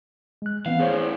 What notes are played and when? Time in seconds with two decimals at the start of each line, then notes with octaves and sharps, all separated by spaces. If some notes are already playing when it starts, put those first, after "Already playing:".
0.42 G#3 F#6
0.66 E3 B3 C4 F5
0.80 E2 A2 G#4 C5 C#5